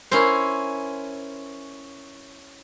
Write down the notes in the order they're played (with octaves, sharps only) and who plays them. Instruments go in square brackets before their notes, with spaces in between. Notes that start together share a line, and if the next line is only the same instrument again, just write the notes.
[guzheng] C#4 E4 A#4 C5